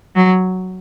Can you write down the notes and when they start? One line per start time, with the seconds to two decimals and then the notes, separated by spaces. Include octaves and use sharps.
0.16 F#3